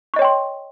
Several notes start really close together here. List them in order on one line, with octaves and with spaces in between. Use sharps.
C#6 D#5 C#5 G5 C6